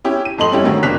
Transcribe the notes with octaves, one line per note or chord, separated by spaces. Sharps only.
C#4 E4 G4
D#7
F2 A2 A3 D#4 C6 F#7
G3 C#4 E4 G4
A2 D3 D#3 F#3 C4 E4
F#1 A#3 D4 F#6 B6 F7